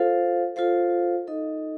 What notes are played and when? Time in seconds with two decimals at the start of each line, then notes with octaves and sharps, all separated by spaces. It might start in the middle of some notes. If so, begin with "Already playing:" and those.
Already playing: F4 A4 C5 F5
0.56 F4 A4 C5 F5
1.27 D#4 A4 D#5